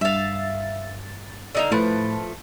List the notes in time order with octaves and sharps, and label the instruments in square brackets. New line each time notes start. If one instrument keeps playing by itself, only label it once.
[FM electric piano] G2 A6 [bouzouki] E5 F5
[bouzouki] D3 D#4 F5
[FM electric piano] A2 B4 [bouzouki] F3 A3